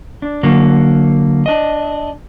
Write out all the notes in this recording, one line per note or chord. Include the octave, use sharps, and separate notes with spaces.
D4
D3 F#3 A#3
D4 D#5